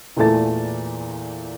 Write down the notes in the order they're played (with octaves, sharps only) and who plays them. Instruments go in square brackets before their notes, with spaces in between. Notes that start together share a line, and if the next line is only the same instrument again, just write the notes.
[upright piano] E2 A#2 E3 A3 A5 A6